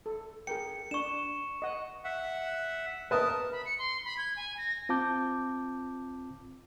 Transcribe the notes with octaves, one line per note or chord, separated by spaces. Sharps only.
A4
G#4 A#4 G5 C#7
D4 C#6 E7
D#5 F#5
E5 F#5
A#4 B4 A5 D#6
B5
C#7
C6
B5
G#6
G#5
A#6
C4 F4 A5 D6 G6